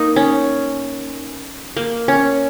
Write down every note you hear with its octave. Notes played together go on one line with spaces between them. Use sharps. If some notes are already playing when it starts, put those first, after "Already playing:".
Already playing: A#3 D#4
C#4
A#3
C#4